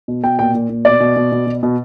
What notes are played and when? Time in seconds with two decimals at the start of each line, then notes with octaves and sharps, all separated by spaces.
0.08 B2
0.24 B2 G5
0.39 A#2 G5
0.54 A#2
0.70 A#2
0.85 B2 D5
1.00 B2
1.17 B2
1.32 B2
1.47 B2
1.63 B2